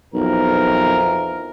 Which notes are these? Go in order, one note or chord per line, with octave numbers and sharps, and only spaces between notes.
B1 F2 E3 A#4